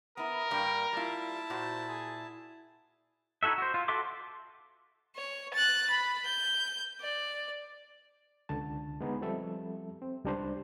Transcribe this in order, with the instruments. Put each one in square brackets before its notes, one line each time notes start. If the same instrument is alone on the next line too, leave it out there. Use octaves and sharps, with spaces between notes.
[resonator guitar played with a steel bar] B3 E4 [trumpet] A#4 [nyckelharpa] D#6
[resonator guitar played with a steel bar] G2 G3 A#3 [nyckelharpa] G5
[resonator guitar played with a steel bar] G3 F4 [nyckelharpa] E4 A5
[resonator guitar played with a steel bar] A#2 F#4 [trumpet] C5
[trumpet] G#4
[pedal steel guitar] D#4 E4 F#4 A4 E5
F#4 C5
F4
F#4 A4 E5 C6 D6
[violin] C#5
F#6 A6
B5
G6
D5
[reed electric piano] C#2 D3 A5
G#3 B3 D#4 G#4
F3 G3 C4 A4 E5
C4
C#2 G3 D4 C5